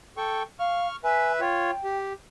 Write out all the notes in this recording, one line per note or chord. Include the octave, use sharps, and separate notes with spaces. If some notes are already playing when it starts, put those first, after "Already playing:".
A4 G5 C#6
F5 C#6 F6
B4 E5 G#5
F4 C#5 G5
G4